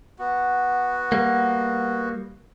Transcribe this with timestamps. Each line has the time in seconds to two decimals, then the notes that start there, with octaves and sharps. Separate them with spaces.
0.19 B3 F#4
1.12 G3 A#3